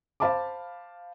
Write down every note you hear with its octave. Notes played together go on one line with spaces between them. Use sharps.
C5 F5 A5 B5 D6